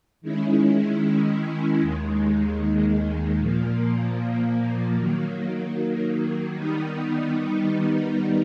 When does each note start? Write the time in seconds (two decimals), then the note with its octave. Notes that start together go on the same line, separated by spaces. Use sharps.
0.21 D#3 G#3 C#4 E4
1.81 D#2 D#3 G#3
3.38 A#2 F3 A#3
4.97 D#3 F#3 A#3
6.56 D#3 G3 B3 D#4